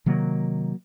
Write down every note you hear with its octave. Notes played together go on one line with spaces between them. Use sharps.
C3 D#3 F#3 A#3